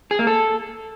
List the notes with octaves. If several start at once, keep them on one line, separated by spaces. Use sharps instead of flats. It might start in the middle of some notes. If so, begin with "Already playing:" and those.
G#4
A#3
A4